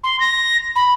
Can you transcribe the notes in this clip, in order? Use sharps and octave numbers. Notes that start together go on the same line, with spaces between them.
C6
A#6
B5